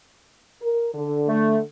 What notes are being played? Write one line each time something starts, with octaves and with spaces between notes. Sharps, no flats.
A#4
D3 A4
A3